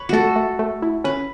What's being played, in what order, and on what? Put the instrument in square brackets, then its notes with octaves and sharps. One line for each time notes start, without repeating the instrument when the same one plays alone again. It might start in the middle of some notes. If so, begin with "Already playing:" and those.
Already playing: [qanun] B4 C#5
[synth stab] A3 [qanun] F#4 A4
[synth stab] A3
A3
E4
[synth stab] C#4 [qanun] B4